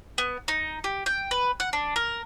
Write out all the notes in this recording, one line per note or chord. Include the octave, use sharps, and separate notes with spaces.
B3
D#4
G4
G5
B4
F#5
D4
A#4